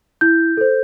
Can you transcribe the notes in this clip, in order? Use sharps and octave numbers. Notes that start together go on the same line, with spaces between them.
E4 G6
A4 C5